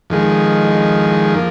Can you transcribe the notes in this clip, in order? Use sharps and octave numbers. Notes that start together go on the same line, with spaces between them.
F2 D#3 G#3
F3 A#3